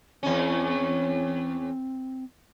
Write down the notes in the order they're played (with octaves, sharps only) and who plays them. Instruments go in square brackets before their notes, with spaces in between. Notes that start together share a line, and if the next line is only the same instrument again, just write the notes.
[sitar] E2 C#4 [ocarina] C4